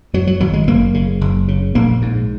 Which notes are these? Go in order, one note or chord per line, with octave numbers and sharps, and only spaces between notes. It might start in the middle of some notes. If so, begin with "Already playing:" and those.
F#2 F#3
F#3
G#1 F#3
G#3
F#1 A#3
C#3
F#1
C#3
A#1 A#3
G#2